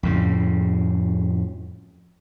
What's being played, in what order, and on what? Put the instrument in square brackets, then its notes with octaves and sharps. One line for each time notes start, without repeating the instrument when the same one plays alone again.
[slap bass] F2 A2 C#3